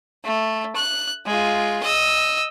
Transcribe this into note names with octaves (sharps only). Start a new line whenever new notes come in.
A3
F#6
G#3 F4
D#5 E6